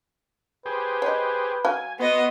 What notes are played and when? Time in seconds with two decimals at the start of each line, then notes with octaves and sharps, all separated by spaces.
0.66 G4 G#4 B4 C5
1.02 C#5 D#5
1.65 F#3 F5 G#5
1.99 B3 F#4 D#5 C6